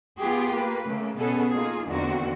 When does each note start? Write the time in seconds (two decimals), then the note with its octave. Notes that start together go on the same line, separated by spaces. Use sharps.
0.19 B3 F4 G4 G#4
0.53 A#3 B4
0.85 C#3 A3 A#3
1.18 B2 B3 C#4 G#4 A4
1.53 A#3 D#4 F4 G#4
1.87 E2 D3 D#3 A#3 C4 F#4